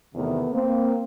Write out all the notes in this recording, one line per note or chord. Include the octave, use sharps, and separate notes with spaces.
E2 C3 D#3 A3 B3
A#3 C4